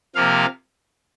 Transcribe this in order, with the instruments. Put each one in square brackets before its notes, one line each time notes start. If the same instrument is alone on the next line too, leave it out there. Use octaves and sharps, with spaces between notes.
[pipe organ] C3 F3 A#3 F5